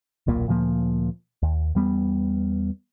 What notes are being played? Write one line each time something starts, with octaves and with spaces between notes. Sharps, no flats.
D#1 B1 A#2 A#3
D2 A#2 F3 A#3
D#2
E2 G3 B3